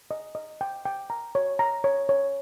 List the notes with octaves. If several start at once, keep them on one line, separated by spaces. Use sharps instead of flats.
D#5
D#5
G5
G5
A#5
C#5
A#5
C#5
C#5